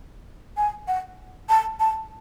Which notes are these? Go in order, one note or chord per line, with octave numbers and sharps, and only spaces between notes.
G#5
F#5
A5
A5